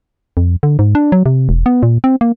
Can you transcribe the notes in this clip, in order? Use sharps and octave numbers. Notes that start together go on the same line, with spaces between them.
F2
D3
G#2
D4
F#3
C3
E1
B3
A#2
C4
A#3